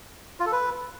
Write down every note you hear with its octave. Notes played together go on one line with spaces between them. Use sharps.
F4
A4
B4